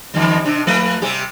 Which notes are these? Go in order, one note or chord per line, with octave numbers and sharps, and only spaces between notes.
E2 D#3 G3
C3 D4
F3 A3 B4
C3 G3 G4